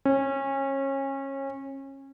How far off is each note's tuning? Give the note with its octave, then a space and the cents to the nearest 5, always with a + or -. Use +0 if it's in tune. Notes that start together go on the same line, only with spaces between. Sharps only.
C#4 -30